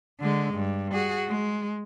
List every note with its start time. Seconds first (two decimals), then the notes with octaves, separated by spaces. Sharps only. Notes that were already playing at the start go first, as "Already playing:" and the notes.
0.20 D3 G#3
0.54 G2
0.92 F#4 G#4
1.28 G#3